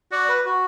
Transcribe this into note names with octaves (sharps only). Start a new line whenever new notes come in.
F#4 D5
B4
F#4